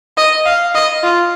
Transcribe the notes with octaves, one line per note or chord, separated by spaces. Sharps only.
D#5
F5
D#5
F4